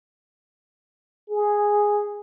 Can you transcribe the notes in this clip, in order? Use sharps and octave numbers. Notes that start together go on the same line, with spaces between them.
G#4